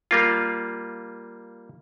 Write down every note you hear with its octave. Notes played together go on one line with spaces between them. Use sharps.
G3 A#3 F4